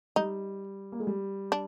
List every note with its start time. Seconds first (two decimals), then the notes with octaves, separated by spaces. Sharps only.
0.16 G3 D#4
0.92 A#3
1.00 G#3
1.07 G3
1.52 D4